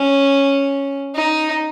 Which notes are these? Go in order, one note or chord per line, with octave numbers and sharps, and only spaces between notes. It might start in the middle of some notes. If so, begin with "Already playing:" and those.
Already playing: C#4
D#4